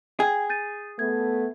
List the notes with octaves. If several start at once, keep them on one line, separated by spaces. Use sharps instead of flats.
G#4 G5 G#6
G6 A6 D#7
A3 B3 G#6